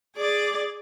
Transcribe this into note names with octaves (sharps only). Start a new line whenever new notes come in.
G#4 D5